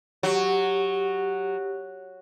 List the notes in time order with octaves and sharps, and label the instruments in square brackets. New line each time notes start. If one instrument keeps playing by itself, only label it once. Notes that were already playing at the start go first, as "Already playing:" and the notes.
[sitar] F#3 [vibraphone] G4